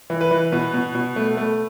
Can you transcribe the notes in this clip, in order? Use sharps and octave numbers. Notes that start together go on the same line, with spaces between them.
E3
B4
E3
B2 B4
B2
B2
A3
A3